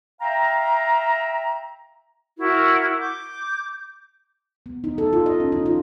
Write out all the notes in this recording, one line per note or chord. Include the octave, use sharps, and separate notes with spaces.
E5 F5 G5 A#5
E4 F#4 A#4
D6 G6
B3
D#4
A4
F4
D#5
C#4
D#4
F4